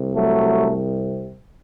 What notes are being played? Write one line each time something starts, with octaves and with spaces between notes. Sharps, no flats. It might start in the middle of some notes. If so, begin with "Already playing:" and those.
Already playing: C2 C3
F#3 A3